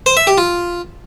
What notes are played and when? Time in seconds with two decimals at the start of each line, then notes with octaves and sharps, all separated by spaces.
0.06 C5
0.17 E5
0.27 G4
0.38 F4